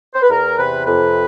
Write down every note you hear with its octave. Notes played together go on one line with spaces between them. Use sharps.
C5
B4
E2 A#4
C3 B4
F2 B4